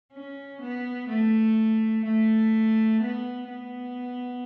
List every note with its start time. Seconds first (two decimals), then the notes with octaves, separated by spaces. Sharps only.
0.13 C#4
0.62 B3
1.09 A3
2.05 A3
3.02 B3
3.49 B3